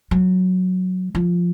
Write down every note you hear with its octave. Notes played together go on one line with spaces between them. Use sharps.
F#3
F3